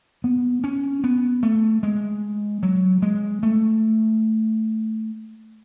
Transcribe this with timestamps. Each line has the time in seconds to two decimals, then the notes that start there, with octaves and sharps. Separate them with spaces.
0.24 B3
0.64 C#4
1.04 B3
1.43 A3
1.83 G#3
2.63 F#3
3.02 G#3
3.43 A3